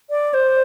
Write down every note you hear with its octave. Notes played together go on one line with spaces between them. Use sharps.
D5
C5